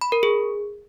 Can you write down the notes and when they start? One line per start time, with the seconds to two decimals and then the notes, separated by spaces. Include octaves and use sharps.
0.01 B5
0.12 A#4
0.23 G#4